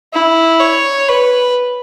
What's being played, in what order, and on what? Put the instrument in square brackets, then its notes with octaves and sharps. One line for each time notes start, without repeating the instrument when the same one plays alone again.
[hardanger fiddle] E4
C#5
B4